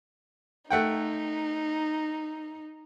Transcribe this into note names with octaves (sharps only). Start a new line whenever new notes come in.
A3 D#4 F#5 G5